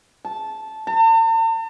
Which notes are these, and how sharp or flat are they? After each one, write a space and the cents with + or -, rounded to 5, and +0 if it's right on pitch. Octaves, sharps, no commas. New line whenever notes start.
A5 -10
A5 +45